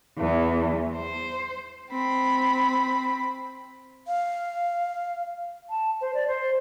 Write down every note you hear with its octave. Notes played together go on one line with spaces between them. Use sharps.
E2
C5
C4 B5
F5
A5
C5
D5
C5